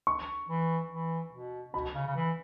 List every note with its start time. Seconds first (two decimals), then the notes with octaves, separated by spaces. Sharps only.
0.07 C#6
0.49 E3
0.90 E3
1.32 B2
1.73 B2 B5
1.95 C#3
2.06 C#3
2.16 E3